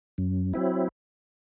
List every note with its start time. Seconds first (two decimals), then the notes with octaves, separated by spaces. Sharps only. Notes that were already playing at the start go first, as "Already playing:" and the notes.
0.18 F#2
0.54 F#3 C4 E4